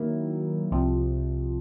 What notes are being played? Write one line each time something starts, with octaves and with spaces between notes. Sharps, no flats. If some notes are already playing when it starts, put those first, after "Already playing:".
Already playing: D#3 F#3 A#3 E4
C2 C3 F3